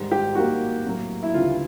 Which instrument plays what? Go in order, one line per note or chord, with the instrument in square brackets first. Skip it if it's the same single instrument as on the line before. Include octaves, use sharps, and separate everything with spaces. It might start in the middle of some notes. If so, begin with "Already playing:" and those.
Already playing: [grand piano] G#2 D#3 G3
[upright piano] G4
[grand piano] D#3 G3 A#3 [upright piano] F#4
[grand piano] A2 F#3 A#3
[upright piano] E4
[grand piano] D2 C#3 E3 G3 [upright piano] F4